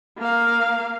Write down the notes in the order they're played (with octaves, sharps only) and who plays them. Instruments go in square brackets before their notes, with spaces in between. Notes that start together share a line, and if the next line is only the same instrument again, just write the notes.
[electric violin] A#3 F5